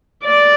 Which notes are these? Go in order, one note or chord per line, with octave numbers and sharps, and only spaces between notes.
D5